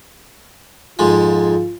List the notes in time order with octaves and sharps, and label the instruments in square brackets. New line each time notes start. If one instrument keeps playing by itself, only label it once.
[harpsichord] F2 G#2 G#3 [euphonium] F4